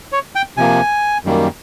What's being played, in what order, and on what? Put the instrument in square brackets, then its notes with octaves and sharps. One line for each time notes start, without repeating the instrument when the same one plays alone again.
[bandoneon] C#5
G5
C3 F3 A#3 G#5
F#2 D#3 G3 A#3